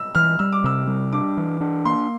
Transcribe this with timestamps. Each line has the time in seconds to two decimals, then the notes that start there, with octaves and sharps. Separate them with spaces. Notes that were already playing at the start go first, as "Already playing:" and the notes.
Already playing: E6
0.15 E3 F6
0.39 G3 E6
0.52 D6
0.64 C3 E6
0.87 G3
1.13 D4 D6
1.37 E3
1.61 D4
1.85 A#3 C6